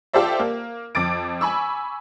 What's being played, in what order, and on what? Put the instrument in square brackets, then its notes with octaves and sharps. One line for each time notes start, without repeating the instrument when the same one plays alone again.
[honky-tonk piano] F4 G4 A4 C5 D5 E5
A#3
F2 D6 A6 D7
G#5 B5 C#6 E6